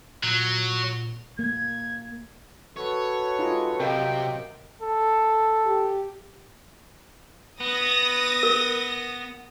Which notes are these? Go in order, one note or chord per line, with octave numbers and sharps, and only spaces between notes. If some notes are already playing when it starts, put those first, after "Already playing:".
A#2 F#3
A#3 G#6
F#4 A4 B4 C#5
G#3 D#4 F4
C3 F#3 A#4 D#5 F5 G5
A4
G4
B3 D#6 A#6
A#4